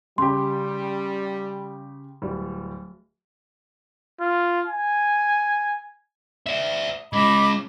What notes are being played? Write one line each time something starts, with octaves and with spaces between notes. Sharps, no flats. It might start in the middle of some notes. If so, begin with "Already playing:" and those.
C#3 G3 G4 C6
D1 G3
F4
G#5
D5 E5
G#3 C#4 D#5 B5 D6